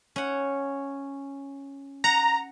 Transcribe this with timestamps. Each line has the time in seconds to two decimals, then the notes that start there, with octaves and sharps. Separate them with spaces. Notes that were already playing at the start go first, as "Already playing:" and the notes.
0.16 C#4 F#5
2.04 F#5 A#5